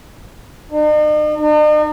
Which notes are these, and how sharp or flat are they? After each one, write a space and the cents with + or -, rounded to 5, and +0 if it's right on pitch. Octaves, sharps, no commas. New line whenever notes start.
D#4 -45
D#4 -45